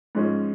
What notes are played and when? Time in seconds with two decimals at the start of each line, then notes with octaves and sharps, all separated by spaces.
0.15 G#2 F3 G#3 C#4